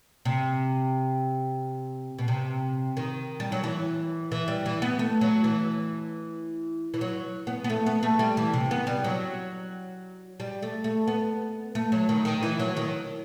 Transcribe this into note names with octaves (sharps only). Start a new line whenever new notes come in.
C3
B2
C3
D#3
G3
F#3
E3
E3
G3
E3
B3
A3
F#3
E3
E3
F#3
B3
B3
A3
B3
A3
G3
E3
C3
B3
G3
F#3
G3
A3
A3
B3
A3
F#3
D#3
D#3
E3
F#3
D#3